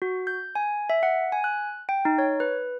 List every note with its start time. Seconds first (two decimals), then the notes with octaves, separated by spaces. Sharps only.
0.02 F#4
0.27 G6
0.55 G#5
0.90 E5
1.03 F#5
1.32 G#5
1.44 F#6
1.89 G5
2.05 D#4
2.18 C#5
2.40 B4